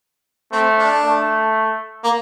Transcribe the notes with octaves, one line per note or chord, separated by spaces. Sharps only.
A3 C4
D4
A3
A#3